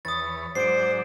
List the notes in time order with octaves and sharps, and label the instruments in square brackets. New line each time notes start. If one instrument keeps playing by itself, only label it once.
[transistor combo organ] E2 B4 C#5 [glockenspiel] D#6 A6
[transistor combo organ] G#2 F#3 D4 [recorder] C5 [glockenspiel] C7 D7